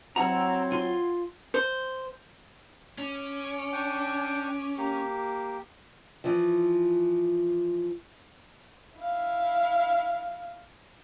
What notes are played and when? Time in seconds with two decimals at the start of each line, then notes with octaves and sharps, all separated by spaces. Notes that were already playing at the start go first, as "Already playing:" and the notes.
0.16 F#3 C4 E4 F#4 A#5 E6
0.72 F4 C6
1.54 C5
2.98 C#4 D6
3.72 D4 G5
4.78 A#3 G4
6.24 E3 F3
8.99 E4 F5